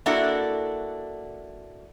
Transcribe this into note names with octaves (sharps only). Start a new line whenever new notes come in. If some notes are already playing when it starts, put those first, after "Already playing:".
A#3 D4 E4 F#4 A4